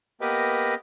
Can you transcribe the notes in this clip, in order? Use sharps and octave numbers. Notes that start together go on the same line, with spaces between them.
A#3 B3 G4 A#4 B4 D#5